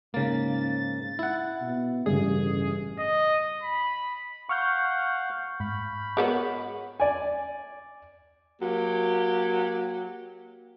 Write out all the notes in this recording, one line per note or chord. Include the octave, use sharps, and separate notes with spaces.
G#2 C#3 A#3 A6
E4 F#5
B2
A1 G2 C#3 G#4
D#5
B5
F5 F#5 C#6 F6 G6
G#2 B5
G#3 B3 F#4 G#4 A#4 C#5
D5 G#5
F#3 A#3 G4